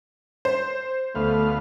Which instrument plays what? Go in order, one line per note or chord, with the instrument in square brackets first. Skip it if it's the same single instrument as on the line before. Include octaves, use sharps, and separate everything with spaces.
[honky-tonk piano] C5
[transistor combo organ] D2 B3 F5 [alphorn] A3